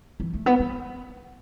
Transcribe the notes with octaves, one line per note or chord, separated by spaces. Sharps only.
E3
A3
B3
A#3